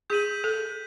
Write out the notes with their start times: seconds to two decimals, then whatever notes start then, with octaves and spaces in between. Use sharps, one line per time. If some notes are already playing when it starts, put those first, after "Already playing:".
0.10 G#4 G6 B6 D#7 F#7
0.44 A4